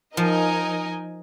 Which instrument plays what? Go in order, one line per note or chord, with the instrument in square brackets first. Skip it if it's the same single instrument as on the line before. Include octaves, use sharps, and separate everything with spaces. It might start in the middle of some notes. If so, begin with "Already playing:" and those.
[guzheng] F3 [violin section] D#4 A#4 D#5 G#5